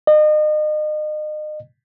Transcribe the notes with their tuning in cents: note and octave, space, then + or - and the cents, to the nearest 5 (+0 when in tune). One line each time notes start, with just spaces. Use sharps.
D#5 -35